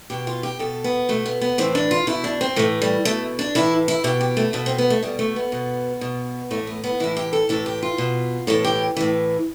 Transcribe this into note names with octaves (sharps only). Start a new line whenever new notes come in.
B2 G4
F4
G4
B2 A4
B3
B2 A3
B3
B3
A2 E3 C4
D4
F4
B2 E4
D4
C4
A2 E3 A3
G3
B2 A3
D4
A2 E3 E4
E4
B2 G4
G4
A3
B2 A3
C4
B3
A3
B2 G3
A3
B3
B2
B2
A2 E3 A3
B3
B3
A2 E3 E4
G4
A4
A2 E3 A4
G4
F4
B2
A2 E3 A4
G4
A2 E3